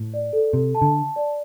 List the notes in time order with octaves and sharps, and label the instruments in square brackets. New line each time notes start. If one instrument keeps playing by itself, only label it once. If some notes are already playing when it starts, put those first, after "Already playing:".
Already playing: [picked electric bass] A2
[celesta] D5
A4
[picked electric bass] C3 [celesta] A4
[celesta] A5
[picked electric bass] D3
[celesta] A5
D5